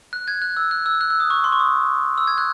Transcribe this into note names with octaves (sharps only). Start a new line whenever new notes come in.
F#6
G#6
F#6
E6
F#6
E6
F#6
E6
D#6
C#6
C6
C#6
D#6
E6
G#6
F#6